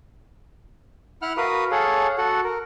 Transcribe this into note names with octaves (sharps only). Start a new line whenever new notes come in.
E4 F#5 F6 F#6
F#4 A#4 B4 F5 D#6
G#4 A4 C#5 F5 F#5
F#4 A4 F#5
A#4